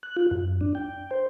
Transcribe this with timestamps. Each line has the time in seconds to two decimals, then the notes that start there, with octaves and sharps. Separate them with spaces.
0.03 F#6
0.17 F4
0.31 F#2
0.61 D4
0.75 G5
1.11 C5